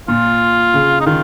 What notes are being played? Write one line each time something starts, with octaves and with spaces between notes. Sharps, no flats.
A#2 F4
C#3
D#4
D#3 F4